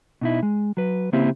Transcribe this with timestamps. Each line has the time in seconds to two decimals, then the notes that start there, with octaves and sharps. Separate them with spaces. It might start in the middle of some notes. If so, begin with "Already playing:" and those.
0.21 B2 D#4 E4
0.43 G#3
0.77 F#3 B4
1.13 C#3 A#3 C4 E4 G4